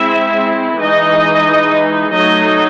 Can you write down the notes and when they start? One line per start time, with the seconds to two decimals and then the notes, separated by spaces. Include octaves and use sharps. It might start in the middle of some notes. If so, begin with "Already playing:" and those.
Already playing: G#3 C4 E4 E5
0.80 E3 G#3 D#4 D#5
2.13 F#3 A3 D#4 D#5